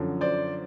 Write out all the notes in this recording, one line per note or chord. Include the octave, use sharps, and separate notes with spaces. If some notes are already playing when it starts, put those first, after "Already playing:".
Already playing: F#2 D3 F3
C5 D5